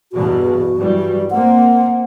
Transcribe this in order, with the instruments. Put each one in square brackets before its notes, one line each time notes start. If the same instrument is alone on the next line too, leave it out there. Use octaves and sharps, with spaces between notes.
[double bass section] E2 G2 B2 [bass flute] F#4
[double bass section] G2 E3 G3
[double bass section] A#3 C4 [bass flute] F#5